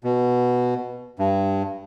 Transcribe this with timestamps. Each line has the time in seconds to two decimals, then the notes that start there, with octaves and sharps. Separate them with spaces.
0.04 B2
1.19 G2